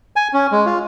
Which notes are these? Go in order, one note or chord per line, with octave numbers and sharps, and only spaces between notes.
G#5
C#4
G#3
F4